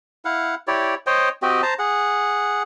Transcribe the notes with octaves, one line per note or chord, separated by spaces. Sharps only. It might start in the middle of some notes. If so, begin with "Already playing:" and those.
E4 F5 F#5
E4 G4 C#5 D5
C5 C#5 D#5 G5
C4 F#4 G4 D#5
C5 A5 A#5
G#4 F#5